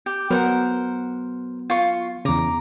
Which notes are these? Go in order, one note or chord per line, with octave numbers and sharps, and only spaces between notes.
G4
F#3 B3 A#4 C5 F#5
F4 C#6
E2 C#3 A#5 D6